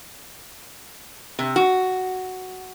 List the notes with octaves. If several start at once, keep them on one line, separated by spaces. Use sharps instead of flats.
C3
F#4